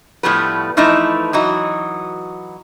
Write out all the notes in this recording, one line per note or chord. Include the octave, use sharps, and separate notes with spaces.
A2 F3 G3 A3 B3 B4
E3 F3 A3 D#4 E4
E3 F#3 D#4 F#4